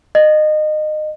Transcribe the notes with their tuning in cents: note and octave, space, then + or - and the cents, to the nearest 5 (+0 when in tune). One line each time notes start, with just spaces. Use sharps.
D#5 -25